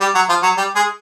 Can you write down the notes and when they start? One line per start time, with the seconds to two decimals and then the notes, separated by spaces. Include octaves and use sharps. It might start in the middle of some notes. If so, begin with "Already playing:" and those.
0.01 G3 G4
0.15 F#3 F#4
0.29 F3 F4
0.43 F#3 F#4
0.57 G3 G4
0.75 G#3 G#4